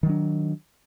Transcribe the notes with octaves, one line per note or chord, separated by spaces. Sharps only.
D#3 F#3 D4